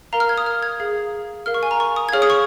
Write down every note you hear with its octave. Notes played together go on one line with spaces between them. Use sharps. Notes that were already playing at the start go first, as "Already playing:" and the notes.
A#4 F5 A#5
F6
G#6
D#6
F6
G#6
G#4 F5
A#4 F5 F6
C#6
G#5
A#5
C#6
D#6
G#6
G#4 C#5 F5 F6
D#6
C#6